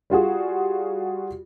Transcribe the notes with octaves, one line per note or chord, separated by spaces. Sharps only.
G3 F4 F#4 G#4